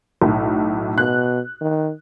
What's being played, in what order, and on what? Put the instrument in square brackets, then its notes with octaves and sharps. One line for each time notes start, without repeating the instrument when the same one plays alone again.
[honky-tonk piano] B1 A2
[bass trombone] B2 [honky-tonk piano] F#6
[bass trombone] D#3